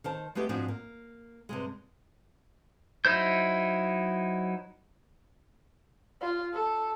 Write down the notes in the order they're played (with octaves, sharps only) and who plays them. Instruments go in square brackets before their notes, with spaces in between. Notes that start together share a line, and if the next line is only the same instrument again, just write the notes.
[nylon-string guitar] D#3 C5 A5
G#3 A3 B3 G4 G#4
G#2 F3 G#3 C4 D4 F#4
A#3
G2 C3 G#3
[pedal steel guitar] F#3 D#4 E4 C5 G6
[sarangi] F4
A4